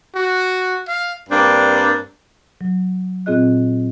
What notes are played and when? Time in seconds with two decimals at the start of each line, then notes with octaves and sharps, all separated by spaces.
0.15 F#4
0.88 F5
1.30 G2 A#3 C4 D4
2.61 F#3
3.26 A#2 C4 F4 G#4 D#5 F#6